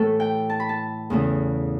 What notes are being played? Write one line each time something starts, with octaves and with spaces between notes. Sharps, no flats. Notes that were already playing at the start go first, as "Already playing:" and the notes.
Already playing: A2 E3 A3 A4
G5
A5
B5
A5
E2 C#3 E3 A3